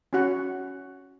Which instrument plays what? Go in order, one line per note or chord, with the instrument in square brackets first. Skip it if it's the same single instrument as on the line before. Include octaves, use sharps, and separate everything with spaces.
[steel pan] C#4 E4 F#4 F#5